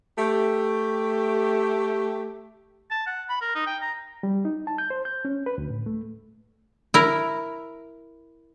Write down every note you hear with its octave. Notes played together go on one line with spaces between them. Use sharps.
A3 G4
A5
F#5
B5
A#4
D#4
G5
A#5
G3
D#4
A5
G6
C5
G6
C#4
B4
D2
A2
A3
E4 A#4